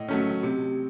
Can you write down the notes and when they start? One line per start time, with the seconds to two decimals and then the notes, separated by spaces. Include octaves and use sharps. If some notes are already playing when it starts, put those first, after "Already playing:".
Already playing: A2 D#5
0.09 F#3 A3 C#4
0.43 C3